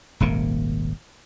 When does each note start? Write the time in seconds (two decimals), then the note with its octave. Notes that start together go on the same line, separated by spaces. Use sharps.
0.20 D#1 G#1 C3 A#3